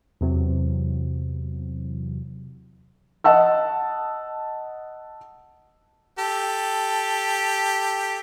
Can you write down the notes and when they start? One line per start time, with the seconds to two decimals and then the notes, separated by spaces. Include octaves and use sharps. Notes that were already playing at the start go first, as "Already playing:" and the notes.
0.21 E2 C3 F#3
3.24 D#5 F#5 A5 E6
6.19 G4 A4